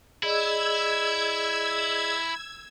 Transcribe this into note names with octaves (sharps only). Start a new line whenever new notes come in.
E4 G#4 D5 D#5 E6 G#6